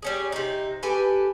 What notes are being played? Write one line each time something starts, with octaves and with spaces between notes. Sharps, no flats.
G3 C#4 G#4
C3 D#4
G4 A4 B4 G#5